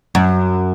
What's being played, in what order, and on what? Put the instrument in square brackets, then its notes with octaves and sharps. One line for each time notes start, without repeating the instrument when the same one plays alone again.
[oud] F#2